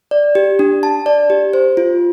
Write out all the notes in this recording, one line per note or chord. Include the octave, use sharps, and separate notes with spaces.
D5
G4
D4
A5
D5
G4
C5
F4